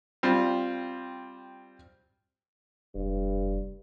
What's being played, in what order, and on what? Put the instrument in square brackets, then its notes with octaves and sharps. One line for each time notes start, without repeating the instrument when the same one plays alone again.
[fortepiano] G3 C4 F4
[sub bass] F1 [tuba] G2